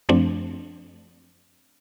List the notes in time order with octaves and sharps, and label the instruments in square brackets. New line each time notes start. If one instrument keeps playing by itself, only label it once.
[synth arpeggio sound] F#2 F3 A3 C4 D4